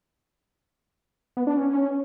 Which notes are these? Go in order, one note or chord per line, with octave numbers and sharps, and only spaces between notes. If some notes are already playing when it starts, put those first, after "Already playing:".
B3
D4
C#4